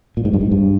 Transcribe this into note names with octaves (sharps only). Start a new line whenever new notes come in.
A#2
G#2
G2
G#2
G2